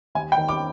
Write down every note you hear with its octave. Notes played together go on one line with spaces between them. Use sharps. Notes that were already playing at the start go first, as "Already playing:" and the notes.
D#2 G#5
G5
D#3
D6